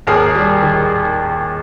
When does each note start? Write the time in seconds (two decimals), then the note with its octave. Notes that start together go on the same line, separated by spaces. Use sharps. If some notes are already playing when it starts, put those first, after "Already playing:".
0.07 D#2 G#4 A#4
0.35 G3
0.62 D#3